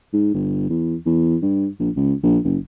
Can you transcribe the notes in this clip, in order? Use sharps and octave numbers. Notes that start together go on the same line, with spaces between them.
G#2
G1
E2
E2
G2
A#1
C#2
A#1
F#1